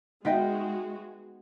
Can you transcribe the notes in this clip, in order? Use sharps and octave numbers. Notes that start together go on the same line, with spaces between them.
G#3 B3 D#4 F4 F#4 D#5 E5 G5